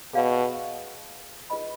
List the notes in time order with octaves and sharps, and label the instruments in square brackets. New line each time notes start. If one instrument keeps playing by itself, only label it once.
[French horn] B2 [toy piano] G#4 D5 F5
[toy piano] F4 G#4 B4 D#5 B5